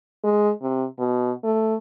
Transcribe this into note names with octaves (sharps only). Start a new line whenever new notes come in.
G#3
C3
B2
A3